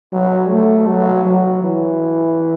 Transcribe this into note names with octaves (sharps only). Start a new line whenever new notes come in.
F#3
A3
F#3
F#3
E3